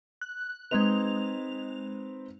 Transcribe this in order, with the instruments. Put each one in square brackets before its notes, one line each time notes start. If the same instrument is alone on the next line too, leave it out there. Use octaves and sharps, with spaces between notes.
[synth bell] F#6
[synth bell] G#3 F7 [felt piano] C4 D#4 B4